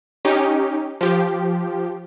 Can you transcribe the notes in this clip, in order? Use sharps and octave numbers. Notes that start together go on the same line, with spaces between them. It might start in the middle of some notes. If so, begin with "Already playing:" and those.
C#4 D#4 G4
F3 G4